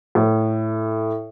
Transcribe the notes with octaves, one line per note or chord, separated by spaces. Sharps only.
A2